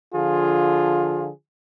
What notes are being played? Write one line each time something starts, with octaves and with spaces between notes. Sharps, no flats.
D3 F3 F4 G#4